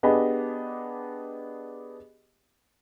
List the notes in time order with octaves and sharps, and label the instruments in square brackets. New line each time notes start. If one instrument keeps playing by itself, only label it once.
[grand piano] B3 D4 G4 G#4 D#5 B5